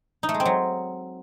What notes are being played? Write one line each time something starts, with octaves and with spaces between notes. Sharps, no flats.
D#4
A3
G#3
C4
F#3